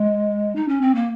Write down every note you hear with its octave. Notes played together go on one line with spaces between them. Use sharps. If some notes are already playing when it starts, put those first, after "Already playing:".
Already playing: G#3
D#4
C#4
C4
A#3